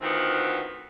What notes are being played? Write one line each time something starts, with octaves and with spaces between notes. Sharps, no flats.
D2 D#3 B3 C4 F4 B4